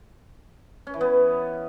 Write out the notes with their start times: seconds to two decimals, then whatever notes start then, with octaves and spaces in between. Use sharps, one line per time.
0.87 C#4
0.94 E3
1.01 B3